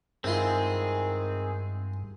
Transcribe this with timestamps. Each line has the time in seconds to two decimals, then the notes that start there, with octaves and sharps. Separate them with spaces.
0.24 G2 D#3 G#3 C4 E4 F4 G#4